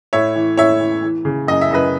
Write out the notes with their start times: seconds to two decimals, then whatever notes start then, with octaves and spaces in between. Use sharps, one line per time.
0.13 A2 C#5 E5
0.36 E3
0.57 A2 C#5 E5
0.81 E3
1.03 E3
1.25 C#3
1.47 F#2 D#5
1.61 E5
1.70 F#2 B4 D#5